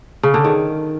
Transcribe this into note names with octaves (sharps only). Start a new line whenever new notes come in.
C#3
D3
D#3